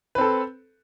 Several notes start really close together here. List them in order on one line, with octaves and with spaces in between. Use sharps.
B4 C4 A4